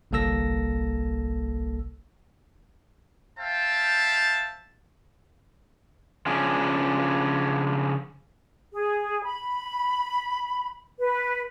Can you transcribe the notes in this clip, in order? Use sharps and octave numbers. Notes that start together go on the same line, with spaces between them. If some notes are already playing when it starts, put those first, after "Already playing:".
G1 C2 A#3 A4 E6 A#6
C5 E5 F5 G5 A5
C#3 F3 C#4 D4
G#4
B5
B4